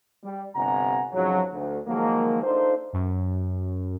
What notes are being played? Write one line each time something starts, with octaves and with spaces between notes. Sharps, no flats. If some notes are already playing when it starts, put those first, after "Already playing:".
G3
G1 C3 F#5 G#5 A#5
F2 G#2 C#3 F3 F#3
D2
D#3 F3 F#3 G#3 A#3
D4 D#4 F4 A4 A#4 C5
F#2